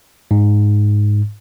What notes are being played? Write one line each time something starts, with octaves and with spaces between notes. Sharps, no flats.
G#2